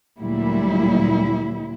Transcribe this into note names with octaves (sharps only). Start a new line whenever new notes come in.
D2 A#2 F#3 G3 E4